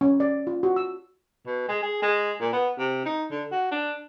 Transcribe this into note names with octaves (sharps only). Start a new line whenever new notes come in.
C#4
D5
F4
F#4
E6
B2
G#3
G#4
G#3
A#2
B3
C3
D#4
D3
F#4
D4